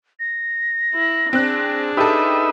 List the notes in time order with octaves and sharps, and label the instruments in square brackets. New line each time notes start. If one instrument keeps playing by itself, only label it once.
[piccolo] A#6
[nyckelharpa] E4
[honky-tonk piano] C4 F#6 [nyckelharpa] D4 G#4
[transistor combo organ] D#4 B4 E5 [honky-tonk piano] G4 A4